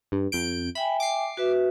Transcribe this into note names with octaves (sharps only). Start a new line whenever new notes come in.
G2
F2 G6 D7
E5 G5 G#5 B5
D6 C7
F#4 B4 E5